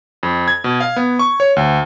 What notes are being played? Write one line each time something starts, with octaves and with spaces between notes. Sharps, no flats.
F2
G#6
B2
F5
B3
C#6
C#5
D2